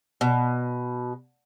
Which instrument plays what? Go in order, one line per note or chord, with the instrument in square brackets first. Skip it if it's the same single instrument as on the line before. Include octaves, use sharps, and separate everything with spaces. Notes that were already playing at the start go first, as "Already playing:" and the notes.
[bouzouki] B2